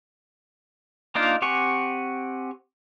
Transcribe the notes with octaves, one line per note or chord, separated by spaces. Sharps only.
A#3 D4 D#4 F4 A#4
C4 G4 F#5 G#5 C#6